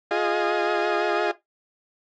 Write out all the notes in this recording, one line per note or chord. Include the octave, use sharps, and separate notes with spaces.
F4 G#4 D#5